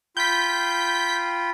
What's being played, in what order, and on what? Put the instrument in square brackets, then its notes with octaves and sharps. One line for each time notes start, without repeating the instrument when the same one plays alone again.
[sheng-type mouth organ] F4 G5 B5 [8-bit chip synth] G6 B6